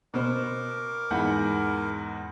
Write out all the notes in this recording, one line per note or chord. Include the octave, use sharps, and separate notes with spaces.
B2 A#4 C5 D6
E2 G#2 F#5 B5 G6